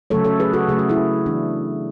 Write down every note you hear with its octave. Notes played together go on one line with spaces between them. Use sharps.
C#3 F#3 A3 A4 C#5
A4 C#5
G#4 B4
F#4 A4
C#3 F#3 A3 G#4
F#4
E4 G#4
E3 B3 D4